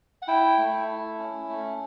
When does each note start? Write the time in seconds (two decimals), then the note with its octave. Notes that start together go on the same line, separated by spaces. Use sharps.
0.22 F#5
0.28 E4 G5
0.58 A3
0.88 E4
1.19 C#4
1.49 A3